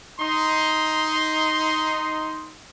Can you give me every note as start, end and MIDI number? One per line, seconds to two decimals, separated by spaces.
0.20 2.54 63
0.20 2.54 84